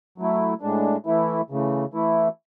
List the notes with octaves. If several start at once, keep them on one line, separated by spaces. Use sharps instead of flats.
F#3 A3 E4
A2 G#3 D4
E3 A3 E4
C#3 E3 A3
E3 A3 E4